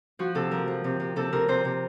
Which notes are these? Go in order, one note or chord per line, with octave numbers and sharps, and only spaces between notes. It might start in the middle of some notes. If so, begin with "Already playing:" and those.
F3 F#4
C3 A4
F3 A#4
F3
C3
C3
C3 A4
C3 A#4
C3 C5
C3